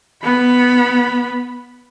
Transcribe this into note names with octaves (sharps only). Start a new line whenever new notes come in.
B3 B5